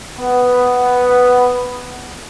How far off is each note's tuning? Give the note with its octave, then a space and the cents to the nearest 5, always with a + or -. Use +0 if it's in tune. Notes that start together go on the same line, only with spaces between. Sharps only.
B3 +5